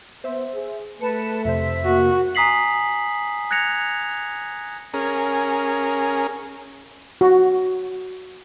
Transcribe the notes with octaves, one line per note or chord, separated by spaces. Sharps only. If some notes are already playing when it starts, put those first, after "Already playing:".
B3 C5 E5
G#4
A3 B4 A5 C#7
F2 C3 C5 E5
A#3 F#4
G#5 A#5 D#6 B6 C7 F#7
F#6 G#6 A#6 C#7 F7
C#4 G#4 A#4
F#4